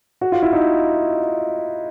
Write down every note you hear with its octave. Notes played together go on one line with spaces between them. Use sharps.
F#4
F4
E4
D#4